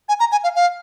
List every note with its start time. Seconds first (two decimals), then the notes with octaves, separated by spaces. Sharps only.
0.09 G#5
0.20 A#5
0.32 G#5
0.44 F5
0.56 F5